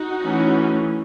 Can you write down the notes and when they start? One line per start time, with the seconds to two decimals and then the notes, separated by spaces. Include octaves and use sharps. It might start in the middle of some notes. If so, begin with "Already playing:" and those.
Already playing: D#4 F#4
0.23 E3 A3 C#4